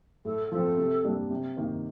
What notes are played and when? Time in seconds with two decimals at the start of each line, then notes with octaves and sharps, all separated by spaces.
0.25 A2 A4
0.52 F3 C4 A4
0.78 C3
1.04 G3 A#3 D4
1.30 C3
1.57 D#3 A#3